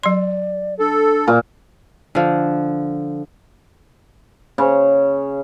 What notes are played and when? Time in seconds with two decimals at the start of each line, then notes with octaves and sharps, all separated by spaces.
0.03 F#3 D5 C6
0.80 D4 A4
1.27 A#2
2.15 D3 F3
4.58 C#3